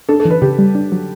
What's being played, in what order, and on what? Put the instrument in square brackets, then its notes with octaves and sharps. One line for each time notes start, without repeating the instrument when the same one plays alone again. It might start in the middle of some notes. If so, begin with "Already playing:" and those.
[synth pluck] D4 [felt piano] A4
[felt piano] A4
[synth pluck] E3
[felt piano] B4
[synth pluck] C#3 [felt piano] G4
[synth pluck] G3
D4
F#3